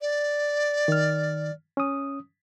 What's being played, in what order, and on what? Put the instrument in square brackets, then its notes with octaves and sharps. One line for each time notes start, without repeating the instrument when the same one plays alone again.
[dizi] D5
[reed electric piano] D#3 F6
C#4 D#6